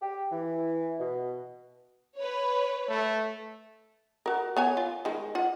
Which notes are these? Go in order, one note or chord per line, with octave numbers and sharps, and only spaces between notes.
G4
E3
B2
B4 C#5
A3
F#4 A#4
B3 C#5 G#5
F4
D#3 G#3
F4 F#5